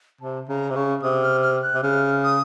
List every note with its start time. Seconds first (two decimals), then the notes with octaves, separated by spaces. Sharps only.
0.21 C3 A5
0.49 C#3 A#5
0.70 C3
0.75 C#3 C#6
1.02 C3 D#6
1.23 F6
1.43 F6
1.63 F#6
1.74 C3
1.83 C#3 F6
2.24 D#6